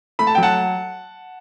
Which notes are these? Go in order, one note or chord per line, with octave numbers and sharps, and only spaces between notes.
A3 B5
A5
F#3 G5
F#5 A5